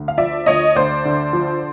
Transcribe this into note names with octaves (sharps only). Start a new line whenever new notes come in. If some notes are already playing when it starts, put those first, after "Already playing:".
Already playing: D2
F5
F3 D5 E5
D2 C#5 D#5
D2 C5 D5
D3
F3